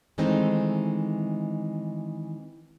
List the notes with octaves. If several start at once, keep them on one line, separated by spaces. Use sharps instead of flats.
D#3 E3 G#3 A3 C4 D#4